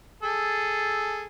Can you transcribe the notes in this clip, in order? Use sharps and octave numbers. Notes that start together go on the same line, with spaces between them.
G#4 A4